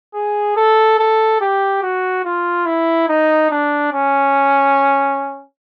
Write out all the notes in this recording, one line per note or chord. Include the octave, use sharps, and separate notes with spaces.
G#4
A4
A4
G4
F#4
F4
E4
D#4
D4
C#4